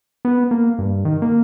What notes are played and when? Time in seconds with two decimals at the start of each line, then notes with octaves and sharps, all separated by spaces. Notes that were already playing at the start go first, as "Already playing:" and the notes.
0.25 B3
0.51 A#3
0.78 G2
1.05 D#3
1.22 A#3